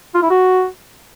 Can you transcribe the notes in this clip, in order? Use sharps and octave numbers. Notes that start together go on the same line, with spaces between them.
F4
E4
F#4